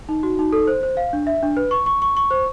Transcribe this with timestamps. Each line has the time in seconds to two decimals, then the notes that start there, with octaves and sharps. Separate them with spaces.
0.09 D#4
0.23 F#4
0.39 D#4
0.53 A4
0.67 C5
0.83 C5
0.97 F5
1.13 D4
1.27 E5
1.43 D4
1.57 B4
1.71 C#6
1.86 C#6
2.02 C#6
2.17 C#6
2.31 C5